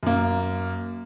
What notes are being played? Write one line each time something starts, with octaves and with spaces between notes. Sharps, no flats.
F#2 A#3